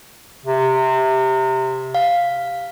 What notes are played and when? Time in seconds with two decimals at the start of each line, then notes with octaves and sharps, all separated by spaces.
0.46 C3
1.95 F5